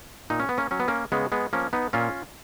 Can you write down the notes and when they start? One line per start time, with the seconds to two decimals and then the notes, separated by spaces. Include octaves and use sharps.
0.30 A#2 D#4
0.40 C#4
0.49 B3
0.58 A#3 C#4
0.71 F#3 C#4
0.80 B3
0.88 A#3 C#4
1.12 C#3 G#3 B3
1.32 G#3 B3
1.53 F3 A#3 C#4
1.73 B3 D#4
1.93 A#2 C#4 F4